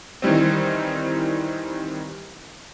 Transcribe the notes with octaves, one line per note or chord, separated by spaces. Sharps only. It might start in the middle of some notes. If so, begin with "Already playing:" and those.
D#3 E3 G3 C4